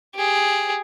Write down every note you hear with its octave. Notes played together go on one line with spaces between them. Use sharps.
G4 G#4